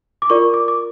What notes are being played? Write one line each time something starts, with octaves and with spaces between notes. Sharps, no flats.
D6
F4 A#4 D5 C#6
D6
D6